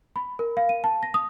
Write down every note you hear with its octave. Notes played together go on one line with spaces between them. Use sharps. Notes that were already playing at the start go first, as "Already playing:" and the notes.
B5
A#4
F5
D#7
A5
A#6
D#6